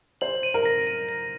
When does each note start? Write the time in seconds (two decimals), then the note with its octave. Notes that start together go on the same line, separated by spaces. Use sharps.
0.21 C5 F#7
0.43 D#7
0.54 A#4
0.65 A#6
0.87 D#7
1.09 A#6